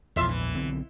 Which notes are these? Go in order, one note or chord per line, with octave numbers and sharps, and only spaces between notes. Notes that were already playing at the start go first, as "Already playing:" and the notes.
A#1 E2 A2 F4 E5
E3
B1 D3 C4